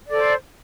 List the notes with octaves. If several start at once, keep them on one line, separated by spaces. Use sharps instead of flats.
A4 C5 D5